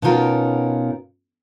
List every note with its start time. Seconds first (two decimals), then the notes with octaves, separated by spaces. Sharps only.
0.02 B2 B3 C#4 D#4 F4 A#4